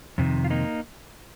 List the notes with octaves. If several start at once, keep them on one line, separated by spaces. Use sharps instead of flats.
F2 C3 D#3
F4
A#3 D#4